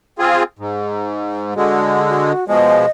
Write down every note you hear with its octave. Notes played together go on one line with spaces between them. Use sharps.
C4 F4 G#4
G#2
D3 G#3 F#4
F#4
B2 F3 G#3 D#5